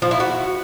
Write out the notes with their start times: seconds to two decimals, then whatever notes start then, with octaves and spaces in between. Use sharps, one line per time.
0.02 F3
0.11 E4
0.20 F#4